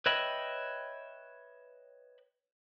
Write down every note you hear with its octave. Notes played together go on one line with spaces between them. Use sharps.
B4 C#5 D#5 E5 G5 B5